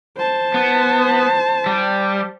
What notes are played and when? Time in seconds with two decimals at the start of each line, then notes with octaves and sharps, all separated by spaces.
0.17 C5 A5
0.54 B3
1.66 G3